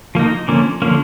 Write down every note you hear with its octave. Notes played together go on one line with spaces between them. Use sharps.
F3 A#3 D#4
D3 F3 A#3 C#4
D3 F3 A#3 C#4